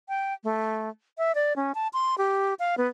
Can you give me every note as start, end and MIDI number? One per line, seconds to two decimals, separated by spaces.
0.09 0.34 79
0.44 0.89 57
1.18 1.35 76
1.35 1.53 74
1.56 1.72 61
1.75 1.88 81
1.93 2.15 84
2.18 2.54 67
2.59 2.75 77
2.78 2.88 59